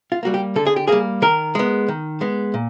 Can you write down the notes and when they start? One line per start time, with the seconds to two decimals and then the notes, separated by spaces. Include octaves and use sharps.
0.12 F4
0.23 G3 A#3 F#4
0.34 G4
0.56 D3 A4
0.66 G#4
0.76 G4
0.87 G3 A#3 G#4
1.22 D#3 A#4
1.55 G#3 B3
1.88 D#3
2.21 G#3 B3
2.54 A#2